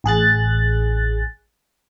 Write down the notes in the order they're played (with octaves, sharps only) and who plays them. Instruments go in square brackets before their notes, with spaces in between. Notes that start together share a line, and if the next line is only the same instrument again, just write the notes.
[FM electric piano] A1 G#4 F#6 A6